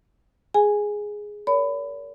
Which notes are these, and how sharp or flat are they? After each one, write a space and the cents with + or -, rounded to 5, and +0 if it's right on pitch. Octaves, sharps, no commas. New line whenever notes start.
G#4 +0 G#5 -5
A#4 +0 C#5 +45 B5 +20